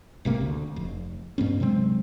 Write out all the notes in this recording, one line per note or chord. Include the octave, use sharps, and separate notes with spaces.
G#1 C3 A#3 C4
D2
F1
G2 B3 C#4
C3 F#3 G#3 C4